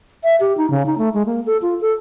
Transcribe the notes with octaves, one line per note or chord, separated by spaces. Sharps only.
E5
G4
D#4
C#3
D#4
A3
G#3
A#3
A4
F4
A4